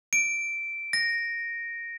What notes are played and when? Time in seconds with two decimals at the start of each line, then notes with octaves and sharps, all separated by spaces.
0.13 D7
0.93 A#6